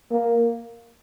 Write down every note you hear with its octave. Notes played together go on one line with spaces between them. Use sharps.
A#3